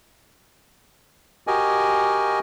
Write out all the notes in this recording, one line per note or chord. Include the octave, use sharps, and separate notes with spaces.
F#4 G4 A#4 D#5 G#5